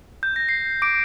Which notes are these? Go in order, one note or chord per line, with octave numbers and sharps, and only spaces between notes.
G6
A#6
C7
D6 D7